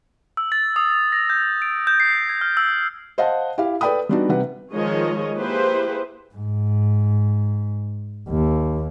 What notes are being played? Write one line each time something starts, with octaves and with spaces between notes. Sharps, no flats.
E6
A6
D#6
A#6
G6
D7
G6
C7
G#6
F6
E6
C5 D#5 F5 F#5 A5
E4 G4 F5
A4 B4 D5 G5 B5 D#6
G3 B3 D4 D#4 F#4
C3 G3 B4 F#5
D#3 F3 G#3 G#4 C#5 D#5
A#3 E4 G4 G#4 B4 C5
G#2
D#2